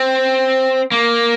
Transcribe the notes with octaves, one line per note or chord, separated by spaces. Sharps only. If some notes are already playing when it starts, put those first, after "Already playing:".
Already playing: C4
A#3